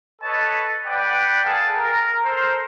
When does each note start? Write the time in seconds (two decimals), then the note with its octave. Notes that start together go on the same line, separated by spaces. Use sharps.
0.22 A4 B4 C#5 D#5 A5
0.86 B4 D5 F#5 G5
1.45 G#4 A4 F5 A5
1.75 A#4
2.23 A4 A#4 C5